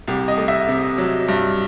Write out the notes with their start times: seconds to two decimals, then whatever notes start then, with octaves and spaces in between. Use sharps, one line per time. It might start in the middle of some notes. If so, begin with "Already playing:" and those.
0.08 C2 G4
0.28 D#5
0.37 A3
0.48 E5
0.68 C3
0.98 F#3
1.28 G2